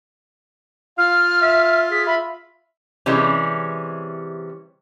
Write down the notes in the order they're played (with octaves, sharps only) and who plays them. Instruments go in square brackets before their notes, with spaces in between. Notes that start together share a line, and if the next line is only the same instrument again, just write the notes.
[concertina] F4 [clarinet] F5 [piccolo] F6
[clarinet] E5
[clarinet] G#4 [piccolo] B6
[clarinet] E5 [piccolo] B5
[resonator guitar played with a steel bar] C3 E3 G3 G#3 C#4